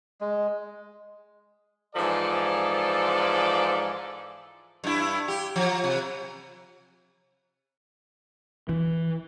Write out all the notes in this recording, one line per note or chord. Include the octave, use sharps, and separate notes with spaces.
G#3
G#2 E3 F3 A4 D5
G2 E4
G4
F3
C3
E3